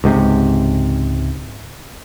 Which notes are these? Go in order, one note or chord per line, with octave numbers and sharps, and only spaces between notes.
C#2 G#2 C3